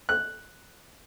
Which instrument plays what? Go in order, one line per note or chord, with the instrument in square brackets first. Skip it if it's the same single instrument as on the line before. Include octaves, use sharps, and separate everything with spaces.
[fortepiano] F#6